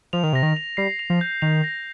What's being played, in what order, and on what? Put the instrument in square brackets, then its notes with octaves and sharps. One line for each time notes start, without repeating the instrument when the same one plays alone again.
[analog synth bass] F3 [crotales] F7
[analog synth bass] D#3
[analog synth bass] C3 [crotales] A#6
[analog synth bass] D#3
[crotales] F7
[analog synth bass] G3 [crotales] C7
[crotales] F7
[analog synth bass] F3
[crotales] G6
[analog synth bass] D#3 [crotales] F7
[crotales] A#6